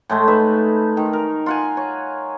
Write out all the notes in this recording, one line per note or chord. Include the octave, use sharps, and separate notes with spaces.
A2 G#3 A3
D#4 B4 E5
D#3
A#4
F4 F#5 G#5
C#5